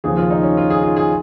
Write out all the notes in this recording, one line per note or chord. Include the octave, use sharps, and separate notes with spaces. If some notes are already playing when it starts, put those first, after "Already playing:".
D#2 C#3 F3 G#4
F4
D#4
C#4
F4
G#4
F4
G#4